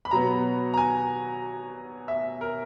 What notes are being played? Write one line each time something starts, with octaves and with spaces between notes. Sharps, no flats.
B5
B2 F#3 B3 A#5
A#5
G#5
E5
A#4